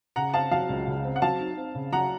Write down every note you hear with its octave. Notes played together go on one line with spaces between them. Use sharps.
C#3 F#5 A#5
C4 F5 A5
F#3 F5 A5
C#2
C#3
C4
F#5
F#3 F5 A5
D#4
C4
C#3
F#3 F#5 A#5